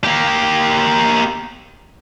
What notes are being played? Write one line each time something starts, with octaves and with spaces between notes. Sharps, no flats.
A#3 G4